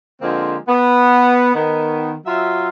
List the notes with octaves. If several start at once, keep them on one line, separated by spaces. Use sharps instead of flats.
D3 F3 G#3 A#3 C4 C5
B3
D#3 B3
F#3 F4 E5